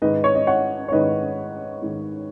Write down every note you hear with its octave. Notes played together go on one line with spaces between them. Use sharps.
G#2 D#3 B4 D#5
C#5
D#5
C#5 F#5
C#5
G#2 D#3 B4 D#5
G#2 D#3